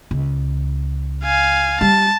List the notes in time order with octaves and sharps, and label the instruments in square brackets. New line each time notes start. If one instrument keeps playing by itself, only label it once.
[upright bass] C#2
[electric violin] F5 G#5
[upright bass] G3 [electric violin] A5